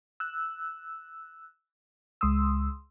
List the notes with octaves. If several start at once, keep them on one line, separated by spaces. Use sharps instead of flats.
E6 F#6
C#2 G#3 C6 D#6 E6